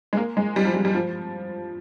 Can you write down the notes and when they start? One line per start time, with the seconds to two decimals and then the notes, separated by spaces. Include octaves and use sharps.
0.13 G#3
0.17 A#3
0.37 G#3
0.56 G3
0.65 F3
0.74 G3
0.85 G3
0.95 F3